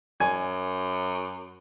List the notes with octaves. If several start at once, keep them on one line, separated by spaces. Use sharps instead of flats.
F#2 G#5